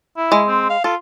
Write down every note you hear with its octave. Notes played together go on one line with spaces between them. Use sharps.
E4
G#3
C4
F5
F4 A4